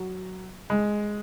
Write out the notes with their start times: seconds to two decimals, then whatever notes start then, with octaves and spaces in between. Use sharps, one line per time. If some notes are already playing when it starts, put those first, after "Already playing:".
Already playing: F#3
0.70 G#3